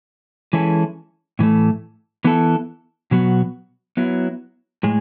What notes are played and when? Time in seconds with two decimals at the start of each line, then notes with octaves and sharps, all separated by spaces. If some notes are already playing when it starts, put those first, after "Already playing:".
0.53 E3 G#3 C#4 E4 A4
1.39 A2 E3 A3
2.24 E3 B3 E4 A4
3.11 B2 F#3 B3 F#4
3.97 F#3 B3 E4
4.83 A2 G#3